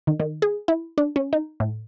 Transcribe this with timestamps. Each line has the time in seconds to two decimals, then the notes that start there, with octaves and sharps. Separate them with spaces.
0.07 D#3
0.20 D#3
0.42 G#4
0.68 E4
0.98 D4
1.16 C#4
1.33 D#4
1.60 A2